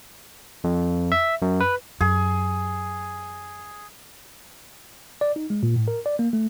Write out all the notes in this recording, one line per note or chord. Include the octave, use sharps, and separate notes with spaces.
F2
E5
F#2
B4
F#2 G#4
D5
D#4
G#3
A#2
A2
A#4
D5
A#3
A3